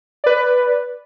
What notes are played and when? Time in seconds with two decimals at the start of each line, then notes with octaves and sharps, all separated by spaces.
0.24 B4 D5